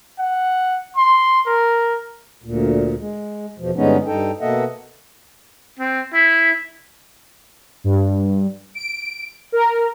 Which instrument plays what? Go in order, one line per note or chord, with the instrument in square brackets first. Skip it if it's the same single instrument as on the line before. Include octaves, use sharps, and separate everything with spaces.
[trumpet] F#5
C6
A#4
[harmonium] D2 A#2
G#3
E2 B2 F3
G2 D3 G#3 B3 C#4 D#4
G2 D#4 A4 G5
B2 A#3 A4 D#5 E5 F#5
[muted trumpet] C4
E4
[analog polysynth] G2
D7
A#4